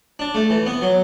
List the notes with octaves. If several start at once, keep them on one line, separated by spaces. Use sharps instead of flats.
D4
A3
E3
B3
F#3